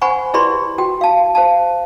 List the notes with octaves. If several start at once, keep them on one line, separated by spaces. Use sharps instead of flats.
C5 F#5 G#5 B5 C#6
E4 G4 B4 D5 B5 C6
F#4 G5
F5 A5
C5 F5 A5